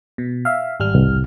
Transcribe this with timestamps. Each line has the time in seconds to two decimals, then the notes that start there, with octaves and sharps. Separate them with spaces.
0.18 B2
0.45 E5 F5
0.80 G#1 G3 F6
0.95 C2